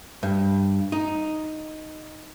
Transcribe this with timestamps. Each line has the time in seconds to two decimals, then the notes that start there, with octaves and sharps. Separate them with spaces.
0.23 G2
0.92 D#4